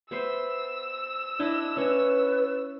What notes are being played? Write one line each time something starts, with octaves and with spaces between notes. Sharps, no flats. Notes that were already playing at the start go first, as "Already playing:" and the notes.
B3 C5 E5 E6
D4 E4 D#5
C#4 B4